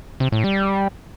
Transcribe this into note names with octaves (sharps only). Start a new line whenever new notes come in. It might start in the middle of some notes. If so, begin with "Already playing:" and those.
C3
A2
G3